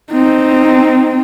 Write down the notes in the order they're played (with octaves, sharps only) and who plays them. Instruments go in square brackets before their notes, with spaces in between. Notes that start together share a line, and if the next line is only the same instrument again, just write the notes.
[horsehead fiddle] C4 D#4